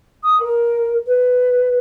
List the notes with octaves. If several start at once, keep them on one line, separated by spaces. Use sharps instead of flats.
D#6
A#4
B4